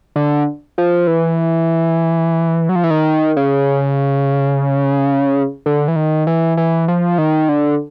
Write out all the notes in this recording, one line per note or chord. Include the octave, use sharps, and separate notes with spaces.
D3
F3
E3
F#3
F3
E3
D#3
C#3
D3
E3
D#3
E3
E3
F3
D#3
D3